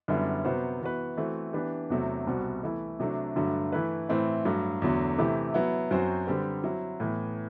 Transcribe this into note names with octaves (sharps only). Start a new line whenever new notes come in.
F#2 D3 G3 B3 E4
C3 F#3 B3 F#4 C5
E3 B3 F#4 B4
E3 A3 C4 F#4
E3 B3 D4 G4 B4
E2 C3 F#3 A3
C2 B2 G3 C4 F#4
E3 A3 E4
C3 F#3 A3 D4
G2 D3 F#3 A3
E3 A3 E4 B4
A2 E3 A3 C4 E4
G2 F#3 A3
E2 D3 F#3 A3
C3 E3 A3 E4 G4
F#3 B3 E4
F#2 F#3 C4 F#4 C5
D3 G3 C4 G4 B4
F#3 C4 E4
A2 E3 B3